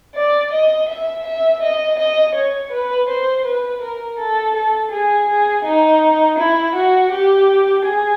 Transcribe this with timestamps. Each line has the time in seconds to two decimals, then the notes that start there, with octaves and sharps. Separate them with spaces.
0.15 D5
0.52 D#5
0.88 E5
1.25 E5
1.62 D#5
1.99 D#5
2.35 C#5
2.71 B4
3.09 C5
3.45 B4
3.81 A#4
4.18 A4
4.54 A4
4.91 G#4
5.27 G#4
5.64 D#4
6.38 E4
6.75 F#4
7.11 G4
7.85 G#4